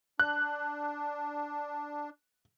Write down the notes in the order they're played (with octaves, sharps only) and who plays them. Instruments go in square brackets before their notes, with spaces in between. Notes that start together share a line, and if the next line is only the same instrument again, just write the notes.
[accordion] D4 [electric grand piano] F#6